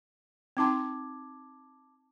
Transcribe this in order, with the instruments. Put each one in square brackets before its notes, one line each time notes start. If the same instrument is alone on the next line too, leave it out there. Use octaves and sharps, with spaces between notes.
[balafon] C4 D#4 C6 [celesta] A5 D6 G#6